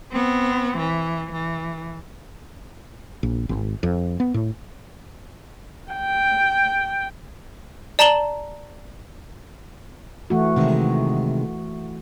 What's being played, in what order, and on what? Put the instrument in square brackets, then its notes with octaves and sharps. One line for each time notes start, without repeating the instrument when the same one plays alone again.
[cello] B3 C4
E3
E3
[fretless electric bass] A#1
G#1
F2
B3
A2
[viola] G5
[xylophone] D5 A5 A#5 E7 F#7 G7
[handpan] E3 A3 F#4
[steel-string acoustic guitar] C3 D#3 G#3